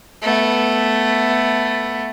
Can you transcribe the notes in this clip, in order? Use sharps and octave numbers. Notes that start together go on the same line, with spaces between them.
A3 B3